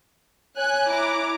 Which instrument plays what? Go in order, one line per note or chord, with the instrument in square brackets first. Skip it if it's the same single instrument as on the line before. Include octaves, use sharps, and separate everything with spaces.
[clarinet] C#5 [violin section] G#5 F#6
[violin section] E4 A#5 D6